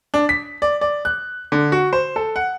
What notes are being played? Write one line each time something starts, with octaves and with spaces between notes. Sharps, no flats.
D4
B6
D5
D5
F#6
D3
F#4
C5
A4
F#5